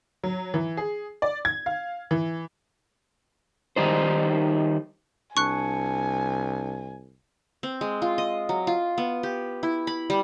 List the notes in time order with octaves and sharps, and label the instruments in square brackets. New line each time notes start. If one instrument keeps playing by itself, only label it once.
[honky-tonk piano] F#3
E3
G#4
D5
G#6
F5
E3
[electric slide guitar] D#3 G3 D#4 C5
[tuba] C2 [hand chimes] D4 A5 C#7 [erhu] G#5 [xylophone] C#6 F#6
[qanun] C4
G#3
F4
D#5
F#3
F4
B3
G4
E4
B5
G3